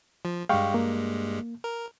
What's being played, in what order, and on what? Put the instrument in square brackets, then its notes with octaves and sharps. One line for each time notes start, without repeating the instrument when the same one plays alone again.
[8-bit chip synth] F3
[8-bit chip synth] G2 G3 G#3 [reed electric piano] F5 G5 C#6
[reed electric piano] A#3
[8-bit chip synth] A#4